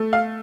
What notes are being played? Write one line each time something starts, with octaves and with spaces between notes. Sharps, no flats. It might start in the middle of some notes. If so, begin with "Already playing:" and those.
Already playing: A3
F5